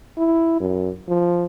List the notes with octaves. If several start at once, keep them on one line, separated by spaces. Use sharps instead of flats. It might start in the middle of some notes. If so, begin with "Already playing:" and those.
E4
F#2
F3